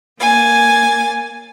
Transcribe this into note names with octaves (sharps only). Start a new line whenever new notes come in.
A#3 G#5 A6